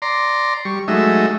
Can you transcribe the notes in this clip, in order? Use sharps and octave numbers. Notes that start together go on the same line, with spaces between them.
D5 A#5 C6
G3 C#6
F#3 G#3 A3 D#4 E5